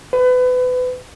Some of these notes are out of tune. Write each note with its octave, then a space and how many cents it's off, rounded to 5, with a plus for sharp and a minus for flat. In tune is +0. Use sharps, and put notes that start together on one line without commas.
B4 +30